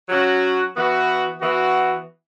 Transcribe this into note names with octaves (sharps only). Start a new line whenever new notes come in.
F#3 C#4 F#4
E3 B3 F#4
E3 B3 F#4